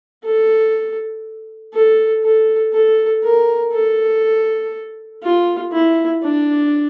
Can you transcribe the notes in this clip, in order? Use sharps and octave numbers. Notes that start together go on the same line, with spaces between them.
A4
A4
A4
A4
A#4
A4
F4
E4
D4